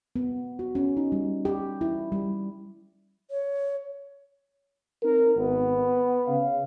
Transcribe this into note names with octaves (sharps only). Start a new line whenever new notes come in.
B3
F#4
C#4
D#4
G3
G4
E4
G3
C#5
C4 D#4 A#4
G#1 B3
C#3 F5